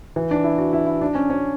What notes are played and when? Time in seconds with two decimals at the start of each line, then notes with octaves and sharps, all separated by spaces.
0.16 E3
0.31 D4
0.44 E4
0.58 F#4
0.73 E4
0.86 E4
1.01 D4
1.15 C#4
1.30 C#4